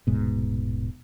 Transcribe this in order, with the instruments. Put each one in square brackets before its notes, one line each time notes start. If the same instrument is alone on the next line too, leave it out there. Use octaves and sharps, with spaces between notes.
[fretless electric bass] D#1 G#2 B2